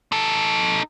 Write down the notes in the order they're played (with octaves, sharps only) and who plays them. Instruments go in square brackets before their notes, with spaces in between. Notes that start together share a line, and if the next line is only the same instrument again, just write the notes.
[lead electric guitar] D#4 A4